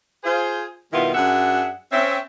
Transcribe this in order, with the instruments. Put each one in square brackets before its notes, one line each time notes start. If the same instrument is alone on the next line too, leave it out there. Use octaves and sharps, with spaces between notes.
[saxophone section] F4 G#4 C5
B2 D#3 G3 B3 E4 F4
F#2 D4 G#4 E5 F#5
C4 C#4 E5